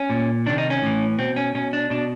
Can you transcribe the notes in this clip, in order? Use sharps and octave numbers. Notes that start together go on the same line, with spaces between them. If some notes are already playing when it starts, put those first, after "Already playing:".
Already playing: C#4
A#2
C3 D#3 D4
D#4
C#4
A2 E3
B2 C4
C#4
B2 C#4
D4
B2 D4